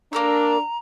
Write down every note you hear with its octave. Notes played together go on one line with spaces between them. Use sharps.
A#3 D4 A#4 A#5 E6